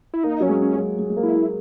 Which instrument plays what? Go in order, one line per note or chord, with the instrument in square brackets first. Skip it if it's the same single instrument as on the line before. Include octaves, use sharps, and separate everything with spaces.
[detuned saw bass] E4
[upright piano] A#3 [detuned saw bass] D#4
[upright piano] F#3 [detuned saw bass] C#4
[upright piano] G#3
[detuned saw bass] C#4
[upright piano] F#3
G#3
G#3
A#3
[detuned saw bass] E4
[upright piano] A#3